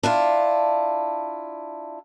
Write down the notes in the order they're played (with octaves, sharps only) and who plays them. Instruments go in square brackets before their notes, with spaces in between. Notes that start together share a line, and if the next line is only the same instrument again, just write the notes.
[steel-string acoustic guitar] D4 E4 F4